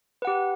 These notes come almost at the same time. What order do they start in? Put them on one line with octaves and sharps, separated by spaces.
B4 F#5 G4